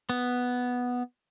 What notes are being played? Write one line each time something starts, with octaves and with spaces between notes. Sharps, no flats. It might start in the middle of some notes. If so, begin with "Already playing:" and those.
B3